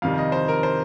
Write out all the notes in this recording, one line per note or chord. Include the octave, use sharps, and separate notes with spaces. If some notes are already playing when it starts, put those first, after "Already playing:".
F2 C3 D#3 G3 F5
D#5
C5
A#4
C5